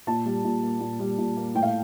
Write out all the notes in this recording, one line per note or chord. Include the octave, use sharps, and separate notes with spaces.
A#2 A5
G3
A#2
A#3
A#2
G3
A#2
A#3
A2 G5
F5